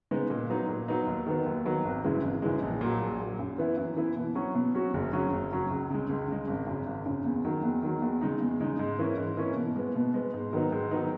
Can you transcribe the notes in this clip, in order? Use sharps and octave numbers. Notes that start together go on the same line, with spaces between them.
C#3 G#3 B3 D#4
A#2
F#3 B3 D#4
A#2
F#3 B3 D#4
D#2
D#3 F#3 B3
D#2
D#3 F#3 B3
G#1
F#2 C#3 E3 G#3
G#1
F#2 C#3 E3 G#3
A#1
A#2 F#3
A#1
A#2 F#3
F#2
E3 B3 E4
F#2
E3 B3 E4
B2
F#3 C#4 F#4
B2
F#3 C#4 F#4
F#1
F#2 C#3 F#3 C#4
F#1
F#2 C#3 F#3 C#4
C#2
C#3 G#3
C#2
C#3 G#3
G#1
F#2 C#3
G#1
F#2 C#3
E2
D#3 F#3
E2
D#3 F#3
E2
C#3 G#3 D#4
E2
C#3 G#3 D#4
G#2
E3 A#3 C#4
G#2
E3 A#3 C#4
B2
G#3 B3
B2
G#3 B3
G#2
D#3 F#3 B3 D#4
G#2
D#3 F#3 B3 D#4